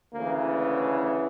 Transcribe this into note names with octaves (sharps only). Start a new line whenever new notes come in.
D2 C#3 E3 A#3
A3